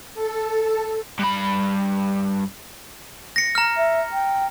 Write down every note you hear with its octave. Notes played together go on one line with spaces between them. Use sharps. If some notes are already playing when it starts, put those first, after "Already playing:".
A4
G2 B5
A#6 C#7
A#5 F6
E5
G5